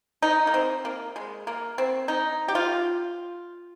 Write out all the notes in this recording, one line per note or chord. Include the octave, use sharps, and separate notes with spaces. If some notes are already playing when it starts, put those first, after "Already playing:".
D#4
A#3
C4
A#3
G#3
A#3
C4
D#4
G4
F4